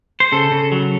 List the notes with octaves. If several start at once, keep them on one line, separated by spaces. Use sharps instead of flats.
C5
C#3 A4
C#3
F#3